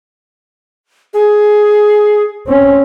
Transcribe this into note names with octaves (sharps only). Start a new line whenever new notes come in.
G#4
C4 C#4